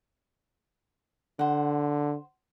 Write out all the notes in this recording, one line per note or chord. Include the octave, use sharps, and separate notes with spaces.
D3 C5 F#5